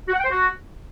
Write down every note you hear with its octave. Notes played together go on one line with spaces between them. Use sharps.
F#4
F#5
G5
C5
F#4